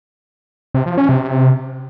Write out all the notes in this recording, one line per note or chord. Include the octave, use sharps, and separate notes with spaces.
C3
F3
C#4
C3